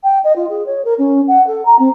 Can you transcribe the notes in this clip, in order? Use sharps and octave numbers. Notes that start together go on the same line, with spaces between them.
G5
D#5
F4
G#4
C#5
A#4
C#4
F#5
A4
A#5
C4